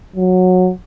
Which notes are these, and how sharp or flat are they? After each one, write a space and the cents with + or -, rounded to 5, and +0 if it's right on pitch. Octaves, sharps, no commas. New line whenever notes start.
F#3 -15